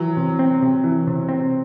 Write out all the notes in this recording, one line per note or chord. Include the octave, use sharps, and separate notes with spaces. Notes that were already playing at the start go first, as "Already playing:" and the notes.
Already playing: E3 F#3
C3
C4
C3
E3
C3
C4